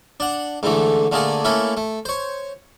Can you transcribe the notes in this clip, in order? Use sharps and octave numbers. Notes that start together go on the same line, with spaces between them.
D4 F#5
G#2 D3 E3 A3
D3 A3 A#3 G#4 D5
A3 A#3 C#4 E4 A4
A3
C5 C#5